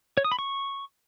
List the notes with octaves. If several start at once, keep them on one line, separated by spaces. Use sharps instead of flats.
C#5
D#6
B5
C#6